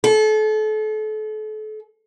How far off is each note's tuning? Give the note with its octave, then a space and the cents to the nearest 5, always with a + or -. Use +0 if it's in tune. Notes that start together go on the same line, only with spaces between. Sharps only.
A4 -35